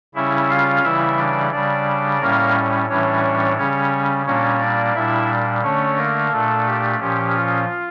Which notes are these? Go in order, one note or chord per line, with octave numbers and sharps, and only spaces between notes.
C#3 G3 C#4 E4 E5
F4 F5
C#3 E3 G3 E4 E5
D4 D5
C#3 G3 D4 D5
A2 G3 A#3 C#4 A#4
A2 E3 G3 C#4 D4 C#5
C#3 G3 C#4 C#5
A#2 G3 A#3 C#4 D4 C#5
D4 D5
A#2 G3 D4 E4 E5
D3 A3 C#4 D4 C#5
A#3 A#4
A#2 A3 D4 A4
G4
A#2 F3 C#4 G4
F4